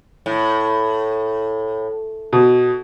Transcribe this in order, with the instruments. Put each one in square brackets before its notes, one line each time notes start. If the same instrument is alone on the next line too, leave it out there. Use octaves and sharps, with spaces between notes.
[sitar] A2
[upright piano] B2